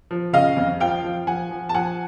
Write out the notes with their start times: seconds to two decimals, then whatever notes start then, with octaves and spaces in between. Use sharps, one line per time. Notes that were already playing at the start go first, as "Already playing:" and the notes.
0.11 F3
0.33 C#3 D#5 F5
0.57 F2
0.80 F3 F5 G5
1.04 F3
1.27 F3 F#5 G#5
1.51 F3
1.69 A5
1.74 F3 F#5 G#5